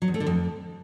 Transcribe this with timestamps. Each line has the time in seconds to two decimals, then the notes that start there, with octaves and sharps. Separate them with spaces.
0.02 F#3
0.08 E2
0.14 A3
0.20 D3
0.27 F2